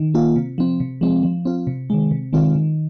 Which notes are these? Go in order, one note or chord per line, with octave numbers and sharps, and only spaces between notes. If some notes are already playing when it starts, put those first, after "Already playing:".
Already playing: D#3
A#3 F4
C3
F3 C4
C3
F3 G#3 C4
F3
C4 F4
C3
D#3 G#3
C3
D#3 G#3 C4 F4
D#3